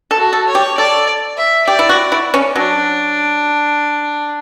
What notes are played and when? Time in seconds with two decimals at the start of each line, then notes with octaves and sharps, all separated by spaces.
0.11 A4
0.18 F#4
0.33 A4
0.48 C#5
0.55 G4
0.78 A4 D5
1.37 E5
1.67 G4 D5
1.79 E4
1.89 F#4
2.12 E4
2.34 C#4
2.56 F#3 D4